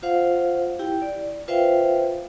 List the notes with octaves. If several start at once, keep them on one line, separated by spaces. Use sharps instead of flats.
F4 C5 F5 F#5
E4 G4 G5
D5
F4 B4 C5 E5 F5 G5